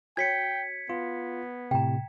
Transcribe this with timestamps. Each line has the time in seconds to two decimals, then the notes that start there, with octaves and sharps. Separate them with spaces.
0.17 F#4 C#5 G5 G#6 B6 C#7
0.90 B3 F4
1.71 A2 C3 G5 A#5